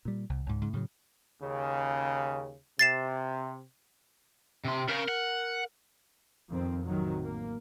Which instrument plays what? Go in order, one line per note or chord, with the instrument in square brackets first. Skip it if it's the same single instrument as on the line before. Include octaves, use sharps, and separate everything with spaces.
[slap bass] A#2 G3
C2
C#2 G#2
G#2 C#3
A2 C#3 F3 F#3
[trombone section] D#2 C#3
[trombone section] C3 [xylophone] A6 C7 E7
[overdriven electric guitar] C3 C6
[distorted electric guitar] C#3 [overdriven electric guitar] A#4
[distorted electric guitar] F#5
[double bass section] F2 D#3 C4
A1 C3 D#3 F#3
A#3